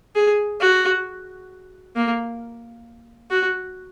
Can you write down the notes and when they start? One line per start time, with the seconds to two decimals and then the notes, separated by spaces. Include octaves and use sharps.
0.15 G#4
0.60 F#4
1.96 A#3
3.31 F#4